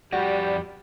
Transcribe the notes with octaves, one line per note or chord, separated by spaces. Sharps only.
F2 G3 F#4 G4 D5